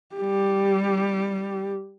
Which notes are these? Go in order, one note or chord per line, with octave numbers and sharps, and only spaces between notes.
G3 G4